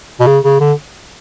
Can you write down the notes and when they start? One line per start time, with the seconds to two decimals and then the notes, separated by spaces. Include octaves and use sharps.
0.20 B2
0.27 C#3
0.44 C#3
0.60 D3